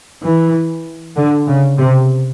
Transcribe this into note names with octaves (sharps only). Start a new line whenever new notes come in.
E3
D3
C#3
C3